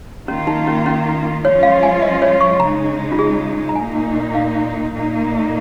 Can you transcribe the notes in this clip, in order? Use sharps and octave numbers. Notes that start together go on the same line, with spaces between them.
D#3 A#3 C#4 F4
D#4
C#4
C#4
F3 G#3 C#4 F4 C#5
F5
G#5
D#5
C#5
C#6
C#3 G#3 D#4 A#5
F4
G#4
A#5
A#2 A#3 D#4 G#5
F5
A#2 A#3 D#4